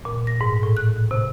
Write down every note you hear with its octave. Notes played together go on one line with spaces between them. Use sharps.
A#2
A#6
G#2
A2
F#6
C3